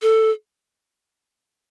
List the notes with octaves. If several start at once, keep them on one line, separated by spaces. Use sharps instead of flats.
A4